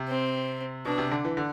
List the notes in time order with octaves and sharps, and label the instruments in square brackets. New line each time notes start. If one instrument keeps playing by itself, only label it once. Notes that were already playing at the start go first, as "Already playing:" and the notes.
Already playing: [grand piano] C3
[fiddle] C4
[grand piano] B2 [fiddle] D4
[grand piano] C3
D3
E3
D3